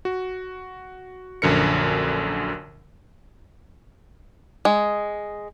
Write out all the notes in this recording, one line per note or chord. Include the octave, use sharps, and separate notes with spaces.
F#4
A#1 F#2 D3 A#4 C#7
G#3